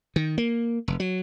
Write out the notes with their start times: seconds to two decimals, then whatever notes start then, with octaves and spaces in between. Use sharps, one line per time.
0.16 D#3
0.38 A#3
0.88 F1
1.00 F#3